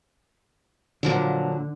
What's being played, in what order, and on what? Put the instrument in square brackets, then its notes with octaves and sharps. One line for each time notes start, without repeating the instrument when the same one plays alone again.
[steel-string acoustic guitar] A#2 F3 F#3 [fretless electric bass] D3